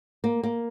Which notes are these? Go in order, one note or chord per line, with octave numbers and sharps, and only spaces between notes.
A#3
A#3